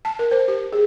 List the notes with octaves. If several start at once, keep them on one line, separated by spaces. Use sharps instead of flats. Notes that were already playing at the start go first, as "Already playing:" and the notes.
A5
A#4
C5
G4
G#4